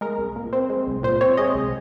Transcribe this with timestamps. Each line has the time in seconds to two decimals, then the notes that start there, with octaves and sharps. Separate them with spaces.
0.01 G#3 A#4
0.18 C2
0.36 A#2
0.53 C4
0.70 G#3
0.87 C2
1.03 A#2 C5
1.21 C4 C#5
1.37 G#3 D#5
1.55 C2